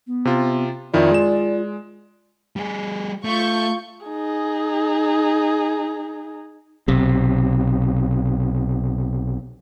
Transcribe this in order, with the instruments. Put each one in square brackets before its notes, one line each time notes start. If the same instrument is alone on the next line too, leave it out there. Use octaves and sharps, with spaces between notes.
[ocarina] B3
[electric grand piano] C3 F4
[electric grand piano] F2 D#3 E4 [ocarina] F4 [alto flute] D5
[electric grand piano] G#3 E7
[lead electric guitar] G3 G#4
[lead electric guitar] A3 [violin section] F4 C#6 G6
[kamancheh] D#4 G#4
[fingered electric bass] B1 C3